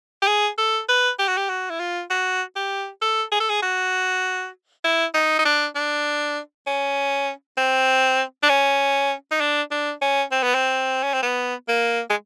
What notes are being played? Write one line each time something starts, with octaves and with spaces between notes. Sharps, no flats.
G4
G#4
A4
B4
G4
F#4
G4
F#4
E4
F4
F#4
G4
A4
G#4
A4
G#4
F#4
E4
D#4
D#4
D4
D4
C#4
C4
D4
C#4
D#4
D4
D4
C#4
C4
B3
C4
C#4
C4
B3
A#3
G#3